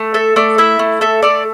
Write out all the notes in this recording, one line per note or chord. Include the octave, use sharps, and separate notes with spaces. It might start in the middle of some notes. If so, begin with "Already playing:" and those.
Already playing: A3
A4 E5
A3 D5
E4 E5
A3
A4 E5
A3 D5